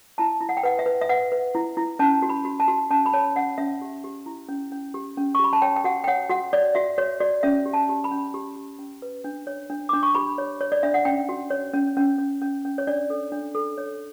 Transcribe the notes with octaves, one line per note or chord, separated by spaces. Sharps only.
E4 A5
E4
F#5
G5
B4 F#5
E5
B4
E5
B4 F#5
B4
E4
E4
C#4 A5
F#4
B5
F#4
A5
F#4
C#4 A5
B5
C#5 A5
C#4 F#5
C#4 E5
G4
G4
E4
C#4
C#4
G4
C#4
C#6
G4 B5
A5
C#5 G5
G5
F#4 F#5
G5
C#5 F#5
F#4 F#5
C#5 D5
F#4 E5
F#4 C#5
F#4 D5
C#4 E5
G4
A5
G4
B5
C#4
G4
G4
C#4
B4
D4
C#5
D4
D4 D6
C#6
G4 B5
C#5
C#5
D5
D4 E5
F#5
C#4 G5
F#4
C#5
C#4
C#4
C#4
C#4
C#4
C#5
D4 D5
A4
D4
A4
C#5